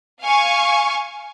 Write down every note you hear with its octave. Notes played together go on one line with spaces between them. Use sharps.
F5 G#5 C#6